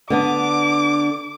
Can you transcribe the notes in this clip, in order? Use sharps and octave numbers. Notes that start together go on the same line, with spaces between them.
D3 B3 D4 D6